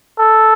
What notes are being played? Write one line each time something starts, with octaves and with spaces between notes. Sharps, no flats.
A4